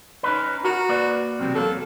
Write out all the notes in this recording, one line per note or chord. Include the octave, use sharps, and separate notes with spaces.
C#4 D#4 B4
F#4 A#4 F#5 A#5
A#3 B4 D5
B1 E2 C3 C4
F#3 G#3 A#3 A4